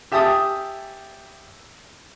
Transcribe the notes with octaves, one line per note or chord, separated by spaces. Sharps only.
G4 E5 G#5 A5 D#6